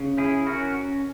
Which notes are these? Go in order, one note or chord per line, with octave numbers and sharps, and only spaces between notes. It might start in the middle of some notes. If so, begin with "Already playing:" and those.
Already playing: C#3
C#4 E4 G#4
C#4 F#4 A#4